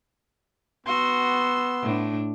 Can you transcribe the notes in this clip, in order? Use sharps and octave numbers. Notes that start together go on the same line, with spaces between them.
B3 F#4 C6 E6
A2 D4